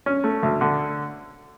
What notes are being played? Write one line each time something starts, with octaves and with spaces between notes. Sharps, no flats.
C#4
A3
D2
D3